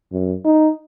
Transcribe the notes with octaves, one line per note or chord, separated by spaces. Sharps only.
F#2
D#4